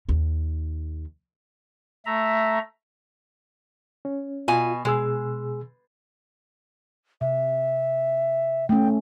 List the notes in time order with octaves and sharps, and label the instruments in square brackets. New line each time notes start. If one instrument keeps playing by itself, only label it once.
[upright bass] D#2 D#3
[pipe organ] A3 E5 A#5
[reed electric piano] C#4
[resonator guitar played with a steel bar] B2 G#5 [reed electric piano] F4
[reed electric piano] B2 G#4 E6 [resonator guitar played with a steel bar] G#3
[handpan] C3 [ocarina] E5
[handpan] A3 C#4 [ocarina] G5